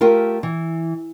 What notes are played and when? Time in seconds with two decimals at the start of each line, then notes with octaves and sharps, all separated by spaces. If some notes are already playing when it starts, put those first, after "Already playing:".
0.01 A3 F4 G4 A#4
0.43 E3